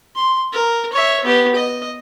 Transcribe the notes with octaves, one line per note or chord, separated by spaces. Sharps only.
C6
A#4
C#5 E5
B3 G4
D#5